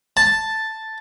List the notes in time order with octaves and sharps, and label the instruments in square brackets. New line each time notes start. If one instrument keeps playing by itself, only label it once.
[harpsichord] A5